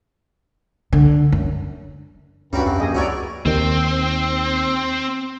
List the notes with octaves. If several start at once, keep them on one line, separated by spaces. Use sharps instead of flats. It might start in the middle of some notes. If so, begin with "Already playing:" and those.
D3
F#2
D2 G2 G3 C#4 F#4 A#4 B4
F2 C3
A#1 G4 G#4 D#5
D2 C#4 E4 F#4 A#4 C#5 D5
D#2 D#3 C4